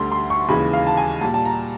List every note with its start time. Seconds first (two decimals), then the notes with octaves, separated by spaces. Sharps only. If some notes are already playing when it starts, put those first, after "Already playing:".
Already playing: D2 D3 G3 C6
0.12 C6
0.30 C#6
0.48 D#2 C#3 E3 G#3 B5
0.73 F5
0.87 A5
0.97 G#5
1.21 A#2 G3 A5
1.34 A5
1.45 A#5